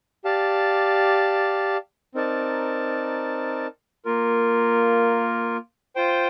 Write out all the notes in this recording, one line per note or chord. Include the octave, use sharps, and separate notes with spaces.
G4 D5 F5 A5
C4 D#4 A#4 D5 A5
A#3 F4 A#4
F4 C5 G5